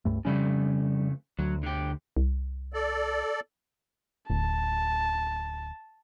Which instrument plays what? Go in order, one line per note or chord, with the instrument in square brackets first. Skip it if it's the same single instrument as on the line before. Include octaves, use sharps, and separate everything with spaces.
[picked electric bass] C#2 G2 A3
[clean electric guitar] F2 C#3 A3 [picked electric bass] G3 C#4
[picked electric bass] D2 [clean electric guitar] F#3
[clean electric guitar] D3 G4
[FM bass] C2
[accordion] A4 D5
[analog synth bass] D1 [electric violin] A5